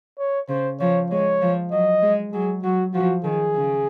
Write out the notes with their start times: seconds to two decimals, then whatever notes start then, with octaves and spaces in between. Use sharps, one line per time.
0.19 C#5
0.49 C#3 C5
0.79 F3 C#5
1.10 G#3 C#5
1.41 F3
1.71 F#3 D#5
2.02 G#3
2.32 F#3 G#4
2.63 F#3 F#4
2.94 F3 F#4
3.24 D#3 G#4
3.55 C#3